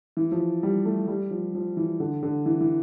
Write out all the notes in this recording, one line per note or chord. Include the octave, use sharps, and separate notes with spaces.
E3
F3
G3
A3
G3
F3
F3
E3
D3
D3
E3
E3